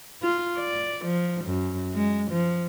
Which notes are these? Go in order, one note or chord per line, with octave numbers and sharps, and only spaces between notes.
F4
D5
F3
F#2
G#3
F3